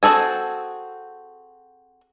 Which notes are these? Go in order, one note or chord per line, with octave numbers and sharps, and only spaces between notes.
C4 F#4 G#4 A4 G#5